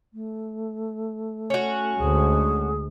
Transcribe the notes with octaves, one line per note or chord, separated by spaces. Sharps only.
A3
C#4 F#4
D2 G#3 G#4